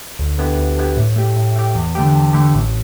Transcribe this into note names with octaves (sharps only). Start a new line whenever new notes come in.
D2
D3 B3 E4 G4
D2
D3 B3 E4 G4
A2
A3 G4
A2
A3 G4
E2
D3 A3 G4
E2
D3 A3 G4
A1